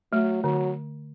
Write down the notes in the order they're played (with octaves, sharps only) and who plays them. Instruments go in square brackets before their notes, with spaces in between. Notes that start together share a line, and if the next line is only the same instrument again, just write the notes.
[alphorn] F#3 [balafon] A3
[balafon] D3 [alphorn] F#3